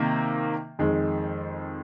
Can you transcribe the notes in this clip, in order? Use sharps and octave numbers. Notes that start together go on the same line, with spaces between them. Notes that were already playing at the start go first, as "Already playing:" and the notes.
Already playing: C3 D#3 A#3
F2 D#3 G#3